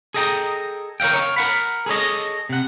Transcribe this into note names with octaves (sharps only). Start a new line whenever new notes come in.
G#4 A4 D#5 G5 A#5
A#4 C#5 E5 F5 G5
C#5 E5 F5
A#4 F#5 B5
G#4 A4 C#5 D#5
C3 F#5